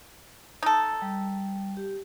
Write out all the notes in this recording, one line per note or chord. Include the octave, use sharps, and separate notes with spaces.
D#4 A4
G3
G4